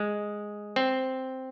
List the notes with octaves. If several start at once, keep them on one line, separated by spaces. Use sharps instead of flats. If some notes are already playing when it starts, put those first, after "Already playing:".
Already playing: G#3
C4